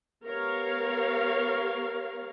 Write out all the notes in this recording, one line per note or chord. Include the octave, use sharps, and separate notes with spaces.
B3 G4 A#4 C#5 F5